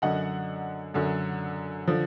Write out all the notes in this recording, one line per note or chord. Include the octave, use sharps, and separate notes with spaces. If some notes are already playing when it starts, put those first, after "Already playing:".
F#2 D3 F#3 D#5 F#5
F#2 D3 F#3
D3 F3